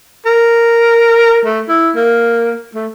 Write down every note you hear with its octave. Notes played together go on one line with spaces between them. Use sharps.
A#4
A3
E4
A#3
A3